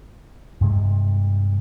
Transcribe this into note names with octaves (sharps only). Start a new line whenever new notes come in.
G2 C3 G#3